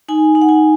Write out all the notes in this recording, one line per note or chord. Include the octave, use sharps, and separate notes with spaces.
D#4 G#5
D#4
F#5
G#5